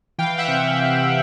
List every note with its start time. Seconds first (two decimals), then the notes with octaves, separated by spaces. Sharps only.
0.18 E3 F5 G5
0.38 E5 F#5
0.48 C3